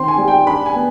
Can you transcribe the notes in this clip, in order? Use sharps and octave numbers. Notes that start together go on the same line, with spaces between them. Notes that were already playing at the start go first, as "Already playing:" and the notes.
Already playing: D#3 C4 C6
G#5
G3
G5
D4 B5
G#5
B3